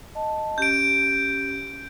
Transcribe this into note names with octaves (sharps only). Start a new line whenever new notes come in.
D#5 A5
C#4 G4 G6 D7